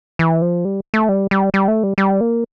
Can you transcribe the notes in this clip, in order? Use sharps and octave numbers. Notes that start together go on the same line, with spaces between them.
E3
F3
G3
A3
G3
G3
G3
A3
G3
G3
A#3